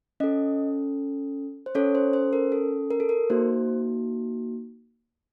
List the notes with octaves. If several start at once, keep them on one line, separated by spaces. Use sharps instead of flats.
C#4 A4 D#5
C5
C#4 A4 C#5
C5
C5
A#4
A4
A#4
A4
A#4
A#3 D#4 F#4 C5